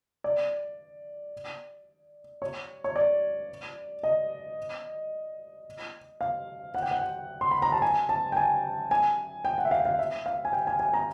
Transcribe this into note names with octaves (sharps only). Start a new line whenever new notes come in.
D5
C#5
C#5
D5
D#5
F5
F#5
G5
F#5
G5
C6
B5
A#5
A5
G#5
A5
G5
G#5
G#5
G5
F#5
E5
F5
F5
E5
F5
G#5
G5
G#5
G#5
A#5